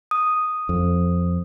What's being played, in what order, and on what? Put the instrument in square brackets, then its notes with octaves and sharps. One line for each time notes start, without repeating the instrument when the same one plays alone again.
[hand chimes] D#6
[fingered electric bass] F2